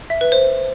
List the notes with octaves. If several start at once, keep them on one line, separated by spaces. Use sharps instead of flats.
E5
B4
C5